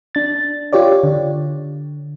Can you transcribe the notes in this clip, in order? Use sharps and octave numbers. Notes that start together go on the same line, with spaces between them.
D4 A6
F4 G4 C#5 D5
D3